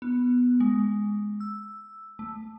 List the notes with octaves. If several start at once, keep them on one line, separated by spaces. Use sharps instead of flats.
B3
G#3
E6
A3